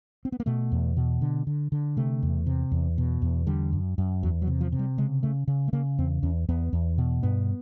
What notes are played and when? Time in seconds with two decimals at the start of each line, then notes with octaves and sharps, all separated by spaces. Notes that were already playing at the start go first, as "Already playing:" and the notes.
0.25 C4
0.32 B3
0.40 A#3
0.46 B2 A3
0.72 E2
0.97 B2
1.21 D3
1.47 D3
1.72 D3
1.97 C3 A3
2.22 E2
2.46 C3
2.72 E2
2.98 B2
3.22 E2
3.47 D3 G3
3.72 F#2
3.98 F#2
4.23 E2 F#3
4.42 F#3
4.47 C3
4.61 F3
4.72 C3
4.79 G3
4.98 C#3 G#3
5.23 C#3 A3
5.47 C#3
5.68 A3
5.73 C#3 A#3
5.98 E2 C4
6.23 E2 C#4
6.49 E2 B3
6.73 E2
6.98 B2
7.23 G2 B3